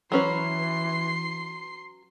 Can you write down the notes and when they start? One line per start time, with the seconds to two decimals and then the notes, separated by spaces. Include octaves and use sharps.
0.12 E3 F#3 C#4 B4 C6 C7